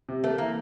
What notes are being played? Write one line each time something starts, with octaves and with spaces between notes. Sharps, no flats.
C3
A3 A#3
E3 A#3